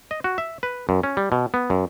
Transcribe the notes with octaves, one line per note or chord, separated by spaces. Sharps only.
D#5
F#4
E5
B4
F#2
C#4
G3
B2
B3
F#2